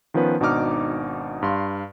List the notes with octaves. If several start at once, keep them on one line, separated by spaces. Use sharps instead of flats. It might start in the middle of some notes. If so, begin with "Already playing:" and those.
D#3 F3 B3 C#4 B4
G#1 B2 D4 D#4 D6 F6
G2 F5 C6